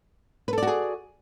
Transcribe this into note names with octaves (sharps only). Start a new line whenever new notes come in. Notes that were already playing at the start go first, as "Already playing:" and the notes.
F#4 G#4 A4 B4 D5